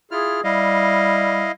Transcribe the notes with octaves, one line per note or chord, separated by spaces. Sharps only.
E4 F4 G#4 F6
G3 E4 D#5 F5